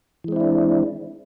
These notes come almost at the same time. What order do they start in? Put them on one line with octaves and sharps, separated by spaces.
E3 G#3 C4 E4 D4